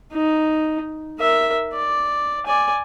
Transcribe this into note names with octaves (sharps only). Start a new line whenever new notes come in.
D#4
A#4 E5
D5
D5 G#5